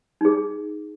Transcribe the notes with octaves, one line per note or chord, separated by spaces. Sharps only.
D#4 G#4